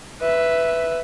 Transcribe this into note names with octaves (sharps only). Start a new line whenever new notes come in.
B4 E5